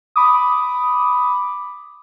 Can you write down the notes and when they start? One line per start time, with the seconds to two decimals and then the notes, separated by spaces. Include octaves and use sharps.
0.16 B5 D6 D#6